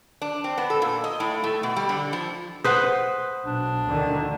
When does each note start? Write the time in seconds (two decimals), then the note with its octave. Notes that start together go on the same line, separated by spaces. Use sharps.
0.22 D4
0.44 C4
0.58 B3
0.70 A4
0.82 A#2
1.04 D#5
1.20 A2
1.44 A3
1.63 B2
1.76 G3
1.89 D3
2.13 F3
2.64 B4 C5 F#5 D#6
3.46 B1 D4
3.88 D2 D3 D#3